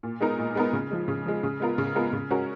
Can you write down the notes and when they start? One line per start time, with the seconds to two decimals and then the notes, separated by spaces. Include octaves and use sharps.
0.03 A#2
0.21 G#3 B3 D#4 A#4
0.38 A#2
0.55 G#3 B3 D#4 A#4
0.73 C#3
0.91 F3 G#3
1.08 C#3
1.26 F3 G#3
1.43 C#3
1.60 G#3 B3 F4 A#4
1.78 C#3
1.95 G#3 B3 F4 A#4
2.13 C#3
2.30 G#3 C#4 F#4 A#4